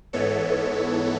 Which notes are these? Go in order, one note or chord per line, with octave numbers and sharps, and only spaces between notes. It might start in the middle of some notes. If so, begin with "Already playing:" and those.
G#2 E3 B3 A4 C#5